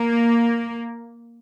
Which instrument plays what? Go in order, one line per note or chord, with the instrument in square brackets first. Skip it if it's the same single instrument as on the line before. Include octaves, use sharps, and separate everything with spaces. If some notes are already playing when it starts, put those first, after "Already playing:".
Already playing: [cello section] A#3